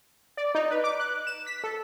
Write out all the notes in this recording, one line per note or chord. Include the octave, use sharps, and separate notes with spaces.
D5
D#4
B4
D6
F#6
E7
B6
A4